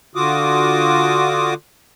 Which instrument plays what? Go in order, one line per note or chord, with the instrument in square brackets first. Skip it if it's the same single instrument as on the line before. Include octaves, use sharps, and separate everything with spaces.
[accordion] D3 F4 F#4 D6 D#6